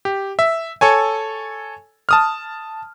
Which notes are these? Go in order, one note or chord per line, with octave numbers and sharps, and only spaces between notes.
G4
E5
A4 C#5 G#5
A5 D#6 F6